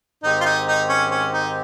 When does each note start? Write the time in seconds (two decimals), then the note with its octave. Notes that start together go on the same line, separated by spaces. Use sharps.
0.23 G#2 D#3 G#3 C4 D#4 G4
0.41 F4
0.45 D#4
0.68 D#4
0.89 C#4
1.11 C#4
1.33 D#4